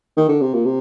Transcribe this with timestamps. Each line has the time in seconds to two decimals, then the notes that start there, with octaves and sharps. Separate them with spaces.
0.17 D#3
0.29 D3
0.41 C3
0.54 A#2
0.65 C3